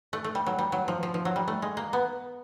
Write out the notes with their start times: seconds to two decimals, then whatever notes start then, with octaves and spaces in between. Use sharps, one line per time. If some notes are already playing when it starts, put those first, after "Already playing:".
0.13 A3
0.24 A3
0.35 G3
0.46 F#3
0.59 G3
0.72 F#3
0.88 F3
1.03 F3
1.14 F3
1.25 F#3
1.36 G3
1.48 A3
1.62 G#3
1.77 A#3
1.93 B3